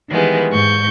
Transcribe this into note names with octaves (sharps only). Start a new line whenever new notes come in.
D#3 E3 G3 G#3 B3
G#2 C#6 G6